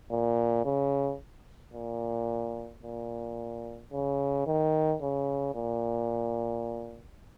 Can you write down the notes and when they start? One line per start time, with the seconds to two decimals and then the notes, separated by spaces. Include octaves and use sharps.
0.11 A#2
0.65 C#3
1.74 A#2
2.83 A#2
3.93 C#3
4.47 D#3
5.02 C#3
5.55 A#2